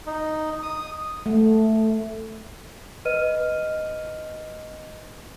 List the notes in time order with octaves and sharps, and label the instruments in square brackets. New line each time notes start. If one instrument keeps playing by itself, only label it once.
[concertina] D#4
D#6
[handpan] A3
[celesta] B4 D#5 F6 D#7